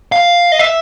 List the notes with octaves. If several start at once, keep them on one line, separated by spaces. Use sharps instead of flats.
F5
D#5
E5